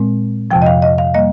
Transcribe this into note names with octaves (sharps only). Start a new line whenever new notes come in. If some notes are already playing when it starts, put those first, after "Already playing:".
Already playing: A#2 G#3 C4
F2 C3 F3 G5
D#5
F5
D#5
F5
G3 A#3 D#5